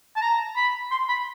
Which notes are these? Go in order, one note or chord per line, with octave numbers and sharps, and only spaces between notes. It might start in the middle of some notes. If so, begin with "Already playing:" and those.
A5
A#5
B5
C6
B5